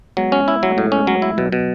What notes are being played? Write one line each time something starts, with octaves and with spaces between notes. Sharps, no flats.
F#3 G#3 B3
C#4
E4
F#3
A3
A2 G#3
C#4
G#3
F#3
E4
B2 F#3
B2